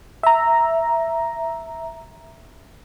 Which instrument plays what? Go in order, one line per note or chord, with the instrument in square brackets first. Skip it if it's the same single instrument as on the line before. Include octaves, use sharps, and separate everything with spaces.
[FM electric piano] E5 A#5